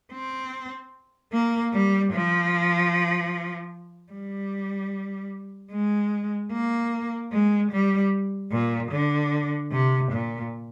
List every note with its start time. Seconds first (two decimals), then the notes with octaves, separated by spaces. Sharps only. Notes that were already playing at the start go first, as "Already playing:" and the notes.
0.13 C4
1.33 A#3
1.73 G3
2.13 F3
4.12 G3
5.72 G#3
6.52 A#3
7.32 G#3
7.72 G3
8.52 A#2
8.92 D3
9.72 C3
10.12 A#2